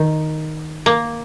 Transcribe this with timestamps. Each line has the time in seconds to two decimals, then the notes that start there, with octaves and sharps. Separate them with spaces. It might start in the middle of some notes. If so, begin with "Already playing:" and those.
Already playing: D#3
0.86 A#3